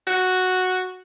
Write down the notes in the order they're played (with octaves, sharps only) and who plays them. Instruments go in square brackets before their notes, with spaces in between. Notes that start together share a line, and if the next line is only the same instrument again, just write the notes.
[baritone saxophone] F#4